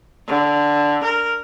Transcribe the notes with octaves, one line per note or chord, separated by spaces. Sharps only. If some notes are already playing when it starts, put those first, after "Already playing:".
D3
A#4